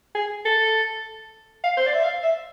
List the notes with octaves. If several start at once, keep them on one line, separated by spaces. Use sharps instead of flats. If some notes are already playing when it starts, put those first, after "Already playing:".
G#4
A4
F5
C5
D5
E5
F5
E5